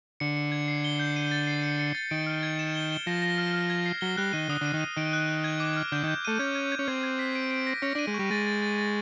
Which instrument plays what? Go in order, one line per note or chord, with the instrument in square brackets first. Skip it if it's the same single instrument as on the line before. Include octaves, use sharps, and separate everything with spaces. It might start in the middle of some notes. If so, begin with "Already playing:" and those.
[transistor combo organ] D3 [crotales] C#7
[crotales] C#7
G#6
C7
G7
G6
D#7
A6
C7
C#7
C#7
A6
[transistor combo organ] D#3 [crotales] D7
[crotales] F6
G#6
E7
G7
G7
[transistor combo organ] F3 [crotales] A#6
[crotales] A#6
F6
F6
G#6
C7
[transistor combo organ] F#3 [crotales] G7
[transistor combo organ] G3 [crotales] F#6
[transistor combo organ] D#3 [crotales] D#7
[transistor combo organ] D3 [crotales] D#6
[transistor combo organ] D3 [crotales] D#7
[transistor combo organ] D#3
[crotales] D#7
[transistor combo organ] D#3 [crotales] D7
[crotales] F#6
F#6
G#6
D6
F6
[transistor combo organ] D3 [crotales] G6
[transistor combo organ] D#3 [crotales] G6
[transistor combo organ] A3 [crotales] D#7
[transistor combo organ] C#4 [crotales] G#6
[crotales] G#6
G#6
[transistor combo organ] C#4
[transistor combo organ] C4 [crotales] G#6
[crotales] G#6
B6
D7
D7
A#6
[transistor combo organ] C#4 [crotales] A#6
[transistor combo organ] D4 [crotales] D#7
[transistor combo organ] G#3
[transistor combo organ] G3 [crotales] C#6
[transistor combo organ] G#3 [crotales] A6
[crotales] A6
A6
A6